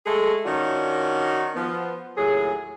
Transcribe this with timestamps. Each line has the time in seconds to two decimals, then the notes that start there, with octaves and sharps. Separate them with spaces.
0.06 G#3 A3 G#4 A4
0.45 D#3 C#4 D4 F4 F#4
1.55 F3 B3
2.17 D#2 A2 F#3 G#4